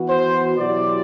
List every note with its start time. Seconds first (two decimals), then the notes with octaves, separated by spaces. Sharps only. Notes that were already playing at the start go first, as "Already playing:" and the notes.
Already playing: E3 B3 F#4
0.08 C5
0.58 B2 F#3 B3 E4 G4 D5